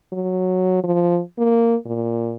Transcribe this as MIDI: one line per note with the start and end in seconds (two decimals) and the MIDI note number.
0.13 0.84 54
0.84 1.20 53
1.38 1.76 58
1.86 2.36 46